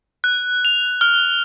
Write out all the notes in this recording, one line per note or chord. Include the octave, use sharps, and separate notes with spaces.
F#6
F7
F6